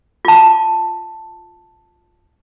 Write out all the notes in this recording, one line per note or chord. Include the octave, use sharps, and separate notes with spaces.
F4 A5